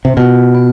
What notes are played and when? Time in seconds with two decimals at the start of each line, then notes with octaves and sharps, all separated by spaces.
0.05 C3
0.17 B2 F4
0.55 B3